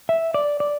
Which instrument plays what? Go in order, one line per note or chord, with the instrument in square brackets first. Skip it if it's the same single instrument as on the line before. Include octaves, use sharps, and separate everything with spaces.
[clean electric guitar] E5
D5
D5